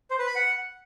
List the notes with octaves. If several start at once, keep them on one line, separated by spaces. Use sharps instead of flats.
C5
B4
B5
F#5